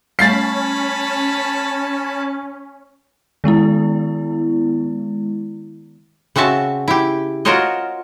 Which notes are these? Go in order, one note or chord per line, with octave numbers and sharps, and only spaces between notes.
G3 A3 C#4 A5 B5 A6 C7
D#3 G#3 B3 E4
C#3 C4 F#4 E5 A5
E4 G4
F4 F#4 A#4 C5 C#5 D#5